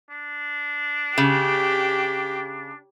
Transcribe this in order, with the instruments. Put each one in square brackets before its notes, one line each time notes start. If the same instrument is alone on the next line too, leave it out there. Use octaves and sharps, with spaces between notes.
[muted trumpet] D4
[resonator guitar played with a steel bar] C#3 [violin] G4